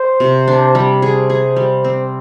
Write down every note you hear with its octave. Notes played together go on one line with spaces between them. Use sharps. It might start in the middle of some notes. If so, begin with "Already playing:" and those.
Already playing: C5
C3
D4
G3
G#4 C5
G#4
G3
C4